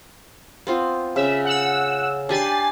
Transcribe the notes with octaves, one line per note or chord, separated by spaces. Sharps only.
B3 C4 F4
C#3 E5
F#5 E6
D4 G4 G#5 B5 A6 C7